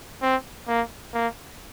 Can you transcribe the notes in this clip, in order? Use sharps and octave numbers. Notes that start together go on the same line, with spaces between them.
C4
A#3
A#3